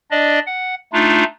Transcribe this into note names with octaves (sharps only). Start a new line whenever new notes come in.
D4 D5 D#5
F#5
A3 D4 D#4 F4